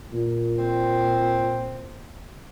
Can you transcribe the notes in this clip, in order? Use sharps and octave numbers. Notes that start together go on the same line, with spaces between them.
A#2
C4